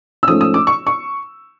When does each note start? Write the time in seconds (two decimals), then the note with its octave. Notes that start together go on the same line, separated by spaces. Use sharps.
0.23 E6
0.28 G#2 F3 A3 C#4 D#6
0.41 D#6
0.54 D6
0.67 C#6
0.87 C#6